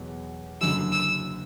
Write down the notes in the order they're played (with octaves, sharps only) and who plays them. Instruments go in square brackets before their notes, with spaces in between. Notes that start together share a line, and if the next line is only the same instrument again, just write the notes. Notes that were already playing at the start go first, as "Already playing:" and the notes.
Already playing: [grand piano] E2 B2 F#3
[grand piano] F#1 F#2 D3 [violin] E6
[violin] E6